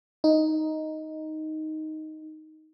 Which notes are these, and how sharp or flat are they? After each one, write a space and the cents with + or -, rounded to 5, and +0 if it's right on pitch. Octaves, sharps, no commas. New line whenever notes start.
D#4 +5